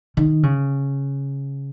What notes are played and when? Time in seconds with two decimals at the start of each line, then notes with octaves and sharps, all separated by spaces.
0.17 D#3
0.43 C#3